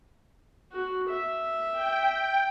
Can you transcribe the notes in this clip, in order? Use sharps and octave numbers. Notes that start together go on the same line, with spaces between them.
F#4
E5
G5